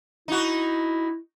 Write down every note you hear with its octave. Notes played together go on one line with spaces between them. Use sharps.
D#4 E4 F#4